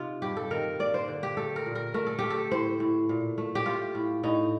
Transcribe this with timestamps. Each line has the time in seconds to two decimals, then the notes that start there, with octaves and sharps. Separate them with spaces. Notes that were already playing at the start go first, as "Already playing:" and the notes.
Already playing: C3 D#4 F4
0.22 G2 G4
0.37 A4
0.51 D#3 A#4
0.79 A#3 D5
0.94 C5
1.08 D3
1.23 G4
1.37 A3 A4
1.56 A#4
1.66 A#2
1.75 A#4
1.94 A3 A#4
2.07 A4
2.19 A3 G4
2.30 A4
2.51 A2 C5
2.80 A2
3.09 A#2
3.38 A3
3.55 G4
3.66 A3 F4
3.95 A2
4.23 A2 D#4